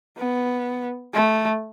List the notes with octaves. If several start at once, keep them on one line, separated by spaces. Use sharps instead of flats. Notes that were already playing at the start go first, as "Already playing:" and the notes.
B3
A3